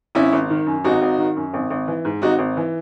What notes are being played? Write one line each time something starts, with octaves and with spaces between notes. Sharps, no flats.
G#1 C#4 E4
G#1
D#3
F#2
G#1 D#4 F#4
G#1
D#3
F#2
G#1
G#1
E3
G#2
G#1 D#4 F#4
G#1
E3